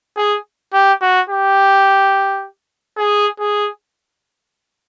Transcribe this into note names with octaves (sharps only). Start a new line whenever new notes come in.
G#4
G4
F#4
G4
G#4
G#4